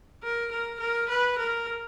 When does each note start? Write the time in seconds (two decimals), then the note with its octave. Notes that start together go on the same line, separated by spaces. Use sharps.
0.23 A#4
0.52 A#4
0.80 A#4
1.09 B4
1.39 A#4